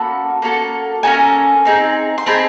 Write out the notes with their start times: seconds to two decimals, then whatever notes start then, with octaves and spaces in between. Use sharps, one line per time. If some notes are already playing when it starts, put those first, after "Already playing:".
Already playing: A#3 C#4 F#4 A4 A5 B5
0.42 A#3 C#4 F#4 A4
1.03 A#3 C#4 F#4 A4 G#5 A#5
1.65 C4 D#4 G#4
2.18 C6
2.26 C4 D#4 G#4 A5 B5